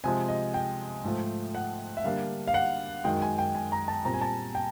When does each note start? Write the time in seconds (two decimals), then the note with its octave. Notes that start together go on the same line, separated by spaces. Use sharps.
0.04 C3 F3 G#3 G#5
0.28 D#5
0.54 G5
1.04 G#2 F3 A3
1.55 F#5
1.97 E5
2.04 D3 G3 A#3 D4 F5
2.48 F5
2.54 F#5
3.04 F#2 D#3 G#3 G5
3.22 G#5
3.38 G5
3.55 G#5
3.72 A#5
3.88 A5
4.05 A#2 G3 C4 A#5
4.14 G#5
4.21 A5
4.55 G5